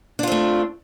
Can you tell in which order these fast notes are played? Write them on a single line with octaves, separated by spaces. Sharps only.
D4 F4 C4 A3